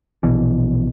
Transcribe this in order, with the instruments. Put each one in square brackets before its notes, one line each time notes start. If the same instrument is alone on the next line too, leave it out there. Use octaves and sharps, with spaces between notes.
[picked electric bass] A#1 B2 E3